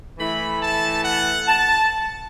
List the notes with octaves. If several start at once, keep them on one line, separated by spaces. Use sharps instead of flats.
E3 A3 E4 B5
A5
F#5
A5